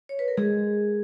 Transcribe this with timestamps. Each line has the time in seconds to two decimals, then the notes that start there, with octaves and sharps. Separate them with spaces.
0.09 C#5
0.19 B4
0.28 A#4
0.37 G#3 G#4